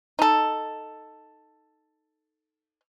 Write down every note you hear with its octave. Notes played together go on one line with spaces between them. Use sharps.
D#4 A4